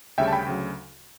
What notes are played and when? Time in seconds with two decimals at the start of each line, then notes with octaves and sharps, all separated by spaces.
0.18 D2 C#3 G3 C#4 E5 G5
0.28 A5
0.33 G5 B5
0.46 D2 C#3 F#3